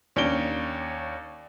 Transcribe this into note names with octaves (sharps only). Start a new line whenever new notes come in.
D#2 C#4 D4 D7 G7